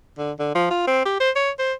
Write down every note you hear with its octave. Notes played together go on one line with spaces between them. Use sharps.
D3
D3
F3
F4
C4
G4
C5
C#5
C5